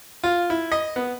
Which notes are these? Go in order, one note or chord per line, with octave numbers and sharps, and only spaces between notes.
F4
E4
D#5
B3